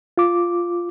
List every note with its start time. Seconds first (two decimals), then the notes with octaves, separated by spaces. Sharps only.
0.18 F4 D6